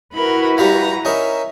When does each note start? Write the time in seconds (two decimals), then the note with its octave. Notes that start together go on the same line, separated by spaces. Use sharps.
0.13 E4 F#4 A#4 B4 B5
0.58 G3 G4 F5 A#5
1.05 C#4 D#4 A#4 E5